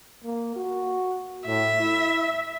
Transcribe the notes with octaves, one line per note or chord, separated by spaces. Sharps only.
A#3
F#4
A2 E5
E4